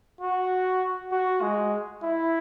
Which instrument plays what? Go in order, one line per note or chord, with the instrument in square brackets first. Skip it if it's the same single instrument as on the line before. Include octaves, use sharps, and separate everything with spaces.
[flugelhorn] F#4
F#4
G#3
E4